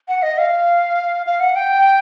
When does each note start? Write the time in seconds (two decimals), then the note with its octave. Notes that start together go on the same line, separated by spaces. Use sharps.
0.08 F#5
0.23 D#5
0.38 F5
1.26 F5
1.40 F#5
1.56 G5